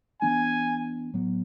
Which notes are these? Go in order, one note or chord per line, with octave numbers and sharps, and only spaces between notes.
E3 B3 D4 G#5
A2 F#3 B3